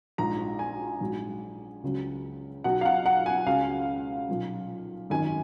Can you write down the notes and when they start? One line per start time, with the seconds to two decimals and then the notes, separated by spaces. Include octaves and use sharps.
0.18 A#1 G#2 F3 A#5
0.59 G#5
1.01 A#1 G#2 F#3
1.83 C#2 C#3 F#3
2.64 B1 B2 F#3 F#5
2.81 F5
2.85 F#5
3.06 F#5
3.26 G#5
3.46 C#2 C#3 F#3 F5
4.29 B1 A#2 F3
5.10 G#1 F#2 D#3 G#5